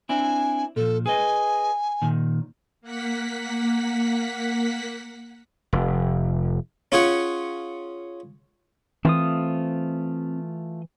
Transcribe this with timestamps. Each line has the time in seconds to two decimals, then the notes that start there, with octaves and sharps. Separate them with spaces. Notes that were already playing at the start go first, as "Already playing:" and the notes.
0.09 C4 D4 E4 G#5
0.76 A#2 F3 A4
1.06 G#4 B4 D#5 G#5
2.02 A#2 D#3
2.81 A#3 F#5 B6
5.73 F1
6.92 C#4 F4 G#4 C#5 F#5
9.05 E3 A3 C4 F4 D#6